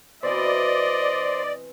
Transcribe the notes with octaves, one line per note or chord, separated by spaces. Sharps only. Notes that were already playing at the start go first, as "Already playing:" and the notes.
B2 E3 C4 C5 D5 D#5